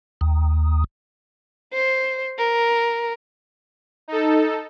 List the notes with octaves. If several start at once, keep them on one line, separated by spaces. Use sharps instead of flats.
D#2
C5
A#4
D#4 A4